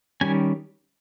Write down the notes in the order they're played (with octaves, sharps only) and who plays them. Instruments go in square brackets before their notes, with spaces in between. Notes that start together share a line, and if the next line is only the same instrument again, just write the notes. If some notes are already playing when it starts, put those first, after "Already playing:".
[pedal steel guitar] D#3 G3 C#4 G#5